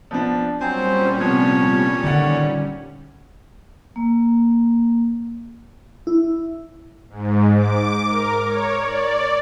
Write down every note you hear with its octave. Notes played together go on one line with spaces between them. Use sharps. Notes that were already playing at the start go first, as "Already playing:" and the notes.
F3 B3 D4
A#2 F#3 G3 C4 C#4 C5 G#5
C3 F3 B3 C#5
D3 D#3 D5 F#5
A#3
E4
G#2
D6
A#4
C#5
D5